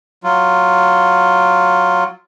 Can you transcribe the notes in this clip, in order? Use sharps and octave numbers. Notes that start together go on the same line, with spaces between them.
F#3 F4